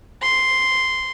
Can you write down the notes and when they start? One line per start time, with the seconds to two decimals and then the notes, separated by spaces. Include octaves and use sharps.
0.22 C6